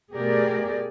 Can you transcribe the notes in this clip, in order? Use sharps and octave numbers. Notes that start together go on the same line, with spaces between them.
B2 A3 G4 G#4 A#4 D5